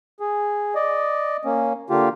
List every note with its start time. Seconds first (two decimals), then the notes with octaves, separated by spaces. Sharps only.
0.20 G#4
0.75 D5 D#5
1.45 A#3 C#4
1.90 D3 A#3 F4 G4